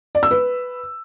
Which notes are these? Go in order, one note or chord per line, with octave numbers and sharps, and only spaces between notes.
D5
E6
B4